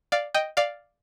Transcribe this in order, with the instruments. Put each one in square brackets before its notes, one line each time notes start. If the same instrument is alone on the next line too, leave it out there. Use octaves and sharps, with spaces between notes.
[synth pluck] D5 F5
D#5 G5
D5 F5